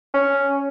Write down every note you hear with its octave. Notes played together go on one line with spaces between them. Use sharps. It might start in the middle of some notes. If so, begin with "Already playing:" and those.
C#4